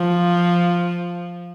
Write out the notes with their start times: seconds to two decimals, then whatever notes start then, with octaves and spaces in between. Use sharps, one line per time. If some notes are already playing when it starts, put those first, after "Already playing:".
Already playing: F3